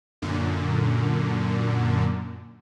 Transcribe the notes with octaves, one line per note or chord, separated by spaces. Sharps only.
F#2 A#2 D3